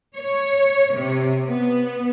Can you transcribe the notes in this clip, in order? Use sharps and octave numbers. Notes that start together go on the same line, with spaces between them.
C#5
C3
B3